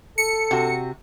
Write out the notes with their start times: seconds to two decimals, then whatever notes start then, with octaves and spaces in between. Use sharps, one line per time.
0.18 A4 C#7
0.51 C3 F#4